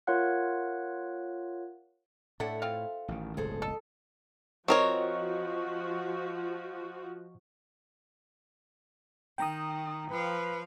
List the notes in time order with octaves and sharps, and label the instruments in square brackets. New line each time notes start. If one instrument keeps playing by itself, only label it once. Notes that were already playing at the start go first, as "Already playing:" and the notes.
[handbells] F4 A#4 C#5 F5 F#5 F#6
[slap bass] A2 [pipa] D4 [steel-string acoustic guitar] A4 E5 F#5
[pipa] C4 F4 F5
[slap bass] A1 D#3
[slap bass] D1 G1 C#2 [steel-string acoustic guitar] G#4 A4 C5
[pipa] A4 [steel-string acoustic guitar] D#5
[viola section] F3 F#4 [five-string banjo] C4 A#4 C#5 [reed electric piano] D#5 C#6
[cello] D#3 [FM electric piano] G5 A#5 D#6
[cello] F3 F5 [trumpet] B4